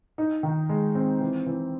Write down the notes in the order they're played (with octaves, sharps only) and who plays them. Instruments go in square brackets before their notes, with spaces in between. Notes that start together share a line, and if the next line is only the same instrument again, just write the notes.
[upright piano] D#4
D#3
G#3
C4
E3
E3